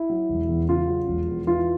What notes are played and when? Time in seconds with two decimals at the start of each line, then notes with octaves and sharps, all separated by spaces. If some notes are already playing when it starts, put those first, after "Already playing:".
Already playing: E4
0.10 F#3
0.29 E1
0.49 E2
0.68 C#3 F4
0.88 F#3
1.08 E1
1.28 E2
1.47 E3 F4